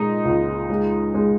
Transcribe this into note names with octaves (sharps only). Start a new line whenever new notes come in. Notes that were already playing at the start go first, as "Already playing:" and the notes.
Already playing: A#2 G#3 D#4
C#2
G#3
G#3